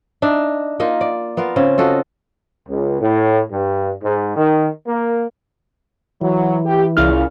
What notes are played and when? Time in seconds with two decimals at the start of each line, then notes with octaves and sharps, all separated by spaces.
0.22 D4 D#4 E5
0.80 A#3 D#4 F4 D#5
1.01 D5
1.37 B3 F4 A#4 F5
1.56 C#3 C4 C#4
1.78 F4 F#4 A4 D#5
2.69 C#2
3.01 A2
3.52 G2
4.04 G#2
4.36 D#3
4.87 A#3
6.21 E3 F#3
6.65 G4
6.97 C2 A#2 C#3 E4 F6